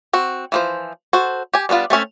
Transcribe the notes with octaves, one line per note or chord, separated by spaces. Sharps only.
C4 F#4
E3 F3 C5
F#4 A4 C5
G4 G#5
G3 B3 D4 F4
A3 C4 C#4 E5